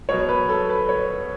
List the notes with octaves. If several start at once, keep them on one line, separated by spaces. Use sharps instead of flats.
B2 F#3 C#5
B4
A4
B4
C#5